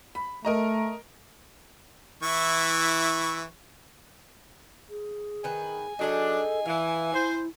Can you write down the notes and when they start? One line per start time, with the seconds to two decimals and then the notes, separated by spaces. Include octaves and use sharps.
0.15 B5
0.45 A3 A#4 D#5 A#5
2.23 E3 E4 C#6
4.90 G#4
5.44 D#3 B4 G#5
5.99 F#3 D4 D#4 G#4 A4 D#5
6.66 E3 E5 F5
7.14 E4 C5